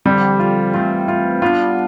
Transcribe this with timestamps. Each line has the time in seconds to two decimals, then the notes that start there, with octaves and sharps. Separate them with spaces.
0.05 D3 F3 G3 C4 G4
0.39 F4
0.74 E3 A3 C4 F4
1.08 F4
1.41 G3 B3 D4 F4